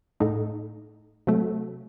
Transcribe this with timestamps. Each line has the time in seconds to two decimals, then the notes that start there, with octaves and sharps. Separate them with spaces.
0.20 A2 A3 D#4
1.27 C3 F#3 A3